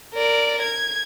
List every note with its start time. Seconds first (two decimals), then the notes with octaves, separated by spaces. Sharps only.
0.14 A#4 D5
0.62 G#6